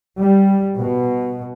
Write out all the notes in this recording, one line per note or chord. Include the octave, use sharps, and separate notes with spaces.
G3
B2